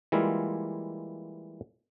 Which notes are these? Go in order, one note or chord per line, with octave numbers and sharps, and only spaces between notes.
E3 G3 G#3 A#3 E4 F4